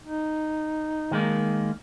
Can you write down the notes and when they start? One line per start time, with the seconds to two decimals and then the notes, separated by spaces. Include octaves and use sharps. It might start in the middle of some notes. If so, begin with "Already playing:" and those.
0.03 D#4
1.11 D#3 G#3 A#3